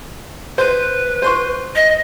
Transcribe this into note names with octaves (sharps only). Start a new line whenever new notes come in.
B4 C5
C5 C6 C#6
D#5